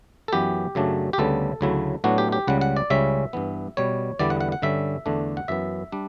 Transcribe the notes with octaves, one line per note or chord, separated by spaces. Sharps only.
A4
F#2 E3 B3 G4
F#2 C#3 F#3 A3 D4
G4
D2 C#3 G3 B3 A4
D2 C#3 F#3 A3 E4
A2 F#3 B3 D4 F#4
G4
G4
C#2 C#3 G3 F#5
F#5
D5
C#2 C#3 G3 C#4 E5
G2 E3 B3
B2 G3 B3 C#5
E2 D3 G3 B3 E4 D5
F#5
F#5
F#5
G2 D3 G3 C#4 E5
E2 D3 A3 D4
F#5
F#2 E3 B3 E5
G3 D4